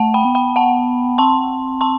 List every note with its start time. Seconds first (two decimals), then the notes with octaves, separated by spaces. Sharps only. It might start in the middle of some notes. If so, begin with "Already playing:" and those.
Already playing: A3 F#5 A5
0.14 G5 B5
0.25 B3
0.35 G5 B5
0.56 F#5 A5
1.18 C4 A5 C6
1.81 A5 C6